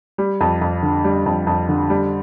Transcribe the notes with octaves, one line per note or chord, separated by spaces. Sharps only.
G3
F2
F2
D3
G3
F2
F2
D3
G3